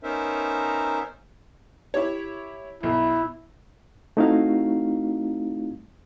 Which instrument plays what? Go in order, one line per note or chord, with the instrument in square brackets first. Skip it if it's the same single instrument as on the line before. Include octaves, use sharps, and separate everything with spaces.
[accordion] B3 C#4 D#4 A#4 C5 E5
[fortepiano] E4 G4 C#5
[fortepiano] B1 [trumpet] E4
[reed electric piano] A3 C4 D#4 E4 F#4 F5